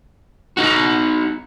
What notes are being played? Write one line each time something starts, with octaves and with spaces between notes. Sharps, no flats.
D#4 F#4